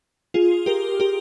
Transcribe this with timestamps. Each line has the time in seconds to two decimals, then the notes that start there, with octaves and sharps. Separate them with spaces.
0.34 F4 G#4
0.66 G4 A#4
1.00 G4 A#4